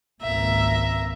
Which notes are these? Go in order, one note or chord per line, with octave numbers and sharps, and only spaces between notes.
G#1 C#2 A#3 E5 A#5